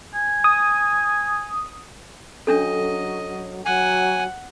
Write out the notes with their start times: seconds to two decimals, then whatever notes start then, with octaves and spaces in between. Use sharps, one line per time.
0.15 G#5
0.44 D#6
2.47 F#3 C#4 D4 A4 D#5
3.66 F#3 F#5 G#5